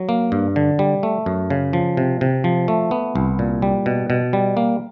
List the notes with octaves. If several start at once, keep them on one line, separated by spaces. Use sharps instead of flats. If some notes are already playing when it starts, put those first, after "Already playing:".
Already playing: F#3
A#3
G2
D3
G3
A3
F#2
C#3
F3
C3
C3
F3
A3
B3
C2
A#2
G3
B2
B2
G3
A#3